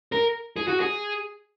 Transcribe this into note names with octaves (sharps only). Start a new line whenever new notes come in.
A#4
G#4
F#4
G#4